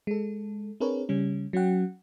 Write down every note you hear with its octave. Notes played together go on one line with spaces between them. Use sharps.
G#3 A4
C4 D4 G#4 A#4 B4 C#5
C#3 G3 C#4
F#3 C#4 F#4 F#5 G5